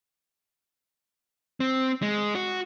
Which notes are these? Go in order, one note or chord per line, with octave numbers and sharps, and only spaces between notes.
C4
G#3
F#4